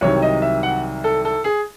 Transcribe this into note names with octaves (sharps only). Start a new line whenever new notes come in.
C2 C3 D#3 F#3 C#5
D#5
E5
F#5
A4
A4
G#4